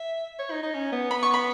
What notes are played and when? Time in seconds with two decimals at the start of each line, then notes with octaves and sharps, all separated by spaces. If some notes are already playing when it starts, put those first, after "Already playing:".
Already playing: E5
0.40 C#5
0.51 D#4
0.63 D#4
0.75 C#4
0.92 B3
1.11 B5
1.23 C#6
1.34 B5